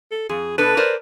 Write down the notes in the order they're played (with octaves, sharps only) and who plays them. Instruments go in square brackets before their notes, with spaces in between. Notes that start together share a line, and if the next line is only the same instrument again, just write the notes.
[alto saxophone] A4
[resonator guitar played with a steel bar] F2 [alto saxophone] G#4
[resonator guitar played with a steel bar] B2 D4 A4 [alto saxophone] B4
[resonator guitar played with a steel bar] A#4 C5 D5